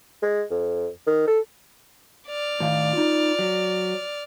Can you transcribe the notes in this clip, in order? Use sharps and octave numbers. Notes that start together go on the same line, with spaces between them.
G#3
F2
D#3
A4
D5 F6
A2 D#3 F5
D#4 F4
F#3